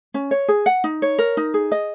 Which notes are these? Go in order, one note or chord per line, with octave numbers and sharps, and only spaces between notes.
C#4
C#5
G#4
F#5
D#4
C#5
A#4
D#4
G#4
D#5